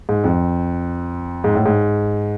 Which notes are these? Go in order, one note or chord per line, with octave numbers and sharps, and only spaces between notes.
G#2
F2
G#2
A2
G#2